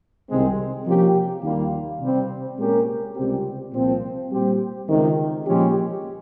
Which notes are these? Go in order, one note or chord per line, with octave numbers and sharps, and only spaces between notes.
C2 C3 D#3 G#3 C4
C3 F3 A#3 C#4 G4
D#2 D#3 G3 A#3 F4
C3 G3 C4
A#2 G#3 C#4 G4 A#4
C#2 C3 G3 C4 G4
C2 A#2 F3 C4
A#2 G3 C4 G4
C#2 C3 D#3
A#2 F3 G#3 C#4 G4